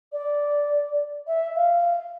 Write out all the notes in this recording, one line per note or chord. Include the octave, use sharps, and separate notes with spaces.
D5
E5
F5